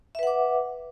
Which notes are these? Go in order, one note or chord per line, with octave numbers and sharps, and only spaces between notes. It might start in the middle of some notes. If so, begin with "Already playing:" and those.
B4 E5 F#5 D6